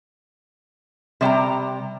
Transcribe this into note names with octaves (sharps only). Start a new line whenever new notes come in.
C3 G3 G5 A#5